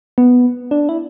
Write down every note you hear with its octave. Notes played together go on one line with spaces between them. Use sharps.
B3
D4
E4